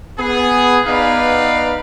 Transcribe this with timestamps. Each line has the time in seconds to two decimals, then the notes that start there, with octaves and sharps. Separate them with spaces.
0.18 B3 G#4
0.86 B3 D#4 B4 D5 F5